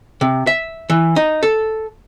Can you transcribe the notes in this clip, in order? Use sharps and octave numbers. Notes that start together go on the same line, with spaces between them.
C3
E5
E3
D#4
A4